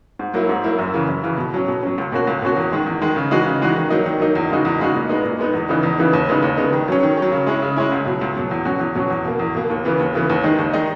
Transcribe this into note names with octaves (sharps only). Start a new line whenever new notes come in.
G#2
F#3 A#3 E4
G#2
F#3 A#3 E4
F#2
C#3 E3
F#2
C#3 E3
B2
F#3 C#4
B2
F#3 C#4
C#2
B2 A#3 C#4 F#4
C#2
B2 A#3 C#4 F#4
E2
D#3 G#3
E2
D#3 G#3
C#3
E3 G#3 D#4 F#4
C#3
E3 G#3 D#4 F#4
D#3
F#3 A#3 D#4
D#3
F#3 A#3 D#4
E2
C#3 G#3 D#4 F#4
E2
C#3 G#3 D#4 F#4
A#2
G#3 B3 D#4
A#2
G#3 B3 D#4
E2
C#3 E3 B3 D#4
E2
C#3 E3 B3 D#4
D#2
C#3 G#3 B3 D#4
D#2
C#3 G#3 B3 D#4
D#3
F#3 C#4
D#3
F#3 C#4
C#3
G#3 C#4 E4
C#3
G#3 C#4 E4
C#2
B2 F#3
C#2
B2 F#3
E2
B2 F#3 C#4 F#4
E2
B2 F#3 C#4 F#4
E2
B2 A#3
E2
B2 A#3
D#2
C#3 E3 B3
D#2
C#3 E3 B3
D#2
D#3 G#3 D#4
D#2
D#3 G#3 D#4